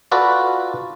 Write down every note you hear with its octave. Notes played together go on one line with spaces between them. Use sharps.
F4 F#4 A4 B4 D5